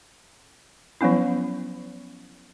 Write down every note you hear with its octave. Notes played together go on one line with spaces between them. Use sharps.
F3 F#3 B3 C#4 E4